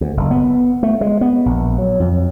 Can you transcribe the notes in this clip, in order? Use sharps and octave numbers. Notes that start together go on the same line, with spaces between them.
D2
F#1
B3
A3
G#3
B3
A#1
F#3
F2